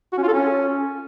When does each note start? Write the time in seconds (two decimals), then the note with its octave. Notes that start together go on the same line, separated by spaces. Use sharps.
0.13 F#4
0.18 C#4
0.23 F4
0.28 A4
0.33 C#4